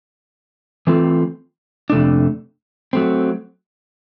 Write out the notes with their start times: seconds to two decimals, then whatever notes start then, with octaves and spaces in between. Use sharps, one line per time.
0.87 E3 A3 C4 F4 A4
1.90 F2 C3 E3 A3 D4
2.93 F#3 A3 C4